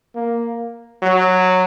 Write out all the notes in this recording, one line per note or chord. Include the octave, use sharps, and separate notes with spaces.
A#3
F#3